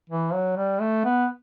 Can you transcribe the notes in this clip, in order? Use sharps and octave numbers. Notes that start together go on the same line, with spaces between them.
E3
F#3
G3
A3
B3